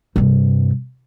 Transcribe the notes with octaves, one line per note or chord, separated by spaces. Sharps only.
G2 C3